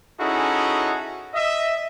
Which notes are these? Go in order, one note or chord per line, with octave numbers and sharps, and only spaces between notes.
C#4 D#4 E4 F#4 G#4 A4
D#5 E5